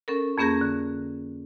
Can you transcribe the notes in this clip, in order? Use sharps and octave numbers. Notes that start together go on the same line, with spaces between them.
C#4 A4 A#4
F2 A#3 C#4 G#4 G6 A#6
D3